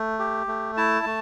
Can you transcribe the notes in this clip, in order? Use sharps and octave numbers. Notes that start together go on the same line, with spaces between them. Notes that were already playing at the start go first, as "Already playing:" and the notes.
Already playing: A3
G4
A3
E4 A5
A3